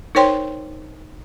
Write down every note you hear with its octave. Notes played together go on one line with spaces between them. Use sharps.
D#4 A#4 C5 C#5 G5 C6